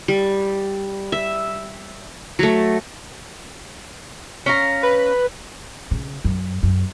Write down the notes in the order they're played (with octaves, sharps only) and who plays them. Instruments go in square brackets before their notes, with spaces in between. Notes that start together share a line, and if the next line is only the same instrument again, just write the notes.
[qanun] G3
E5
F#3 A3
[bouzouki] C#4 F5 A#5
[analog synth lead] B4
[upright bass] C#3
F#2
F#2